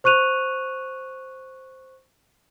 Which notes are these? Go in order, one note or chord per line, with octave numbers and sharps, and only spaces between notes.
C5 C#6 F#6 D#7 F7